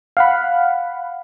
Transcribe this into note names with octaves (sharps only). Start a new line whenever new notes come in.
F5 F#5 B5